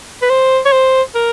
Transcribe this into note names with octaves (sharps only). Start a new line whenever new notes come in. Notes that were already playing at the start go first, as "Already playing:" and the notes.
B4
C5
C#5
C5
A#4